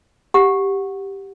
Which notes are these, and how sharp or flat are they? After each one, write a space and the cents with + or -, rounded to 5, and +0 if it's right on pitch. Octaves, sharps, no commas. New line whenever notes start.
G4 +0 F#5 -10